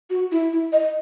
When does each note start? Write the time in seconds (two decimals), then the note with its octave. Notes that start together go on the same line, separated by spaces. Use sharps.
0.10 F#4
0.32 E4
0.53 E4
0.72 D#5